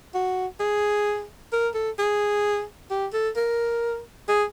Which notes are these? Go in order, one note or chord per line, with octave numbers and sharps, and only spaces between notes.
F#4
G#4
A#4
A4
G#4
G4
A4
A#4
G#4